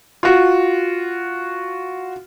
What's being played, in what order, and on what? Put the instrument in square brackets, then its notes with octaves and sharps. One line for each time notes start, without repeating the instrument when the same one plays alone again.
[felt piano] F4 F#4